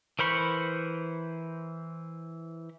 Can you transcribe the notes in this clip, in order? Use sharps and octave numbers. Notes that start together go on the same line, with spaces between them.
E3 A#4 C5 B5 C#6